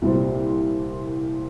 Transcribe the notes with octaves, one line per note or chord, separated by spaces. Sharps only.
C2 A#2 G3 C4